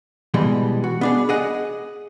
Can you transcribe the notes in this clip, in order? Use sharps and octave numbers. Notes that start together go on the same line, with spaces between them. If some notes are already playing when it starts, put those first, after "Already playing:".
B2 E3 G3 G#3
F#4
B3 D4 G#4
G#4 D#5 F#5